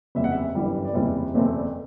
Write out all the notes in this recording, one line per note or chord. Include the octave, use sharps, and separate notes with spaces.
F#1 E2 C3 G3 E5
F#5
E5
G1 F#2 E3 G3
D5
F#1 E2 C3 E3 G3 E5
F#1 E2 B2 A3 C4 E5
D5